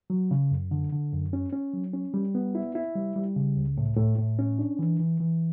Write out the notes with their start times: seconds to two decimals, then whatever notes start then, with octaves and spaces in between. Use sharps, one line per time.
0.10 F#3
0.31 C#3
0.51 F#2
0.71 D3
0.92 D3
1.12 F#2
1.33 C#4
1.53 C#4
1.74 F#3
1.93 C#4
2.14 G3
2.35 B3
2.55 E4
2.75 E4
2.95 G3
3.16 G3
3.36 C#3
3.57 C#2
3.77 A2
3.97 A2
4.18 A2
4.39 C#4
4.59 D4
4.79 E3
4.99 E3
5.20 E3